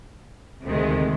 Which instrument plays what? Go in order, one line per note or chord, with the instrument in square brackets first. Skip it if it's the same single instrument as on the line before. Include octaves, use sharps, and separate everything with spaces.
[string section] D2 C3 D#3 G#3